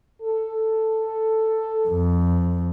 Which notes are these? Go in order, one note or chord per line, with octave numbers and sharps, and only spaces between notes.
A4
F2